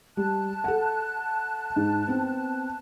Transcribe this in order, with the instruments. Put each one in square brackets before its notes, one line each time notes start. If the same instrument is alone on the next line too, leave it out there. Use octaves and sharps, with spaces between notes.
[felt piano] G3 [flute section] A5 F#6
[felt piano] A4 F#5
G#2
B3 C4